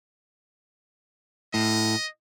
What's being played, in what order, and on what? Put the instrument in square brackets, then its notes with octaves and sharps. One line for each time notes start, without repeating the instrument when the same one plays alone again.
[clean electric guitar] A2 [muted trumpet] D#5